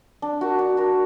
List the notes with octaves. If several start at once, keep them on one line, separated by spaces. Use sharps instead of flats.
D4
F#4 A#4
D4
F#4 A#4